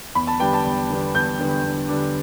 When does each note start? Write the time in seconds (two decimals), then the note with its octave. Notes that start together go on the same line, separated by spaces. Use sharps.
0.15 E2 B5
0.27 A5
0.40 D3 G3 B3 D4 G5
0.53 A5
0.65 E2
0.90 D3 G3 B3 D4
1.15 E2 G6
1.39 D3 G3 B3 D4
1.64 E2
1.88 D3 G3 B3 D4